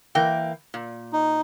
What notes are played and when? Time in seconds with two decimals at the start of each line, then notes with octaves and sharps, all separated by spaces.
0.15 E3 A#3 G5
0.74 A#2
1.13 D#4